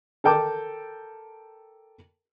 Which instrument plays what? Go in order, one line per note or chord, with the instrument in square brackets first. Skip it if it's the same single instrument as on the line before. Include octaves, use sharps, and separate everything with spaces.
[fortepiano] A4 A#4 G5 A5 D6